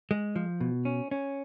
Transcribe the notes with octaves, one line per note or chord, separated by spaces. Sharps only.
G#3
F3
B2
C#4
C#4